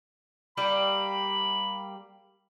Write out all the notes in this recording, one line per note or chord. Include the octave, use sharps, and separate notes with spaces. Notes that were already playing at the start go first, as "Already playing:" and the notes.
G3 A#3 G4 B5